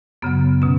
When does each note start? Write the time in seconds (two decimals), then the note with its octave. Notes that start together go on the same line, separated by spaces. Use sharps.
0.22 F#2 C#3 F#3 B3
0.62 B2 C#4